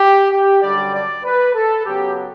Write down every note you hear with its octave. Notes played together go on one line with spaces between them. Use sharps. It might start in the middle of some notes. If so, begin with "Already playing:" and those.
Already playing: G4
G4
F#2 D3 G3 D4 D5
D5
B4
A4
C#3 F#3 B3 G4